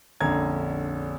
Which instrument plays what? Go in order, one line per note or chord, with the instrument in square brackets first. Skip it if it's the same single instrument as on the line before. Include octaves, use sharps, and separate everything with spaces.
[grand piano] A#1 F2 D3 C#4 A#5 G#6